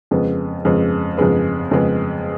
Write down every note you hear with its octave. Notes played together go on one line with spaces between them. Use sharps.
F2 C#3 G#3 B3
F2 C#3 G#3 B3
F2 C#3 G#3 B3
F2 C#3 G#3 B3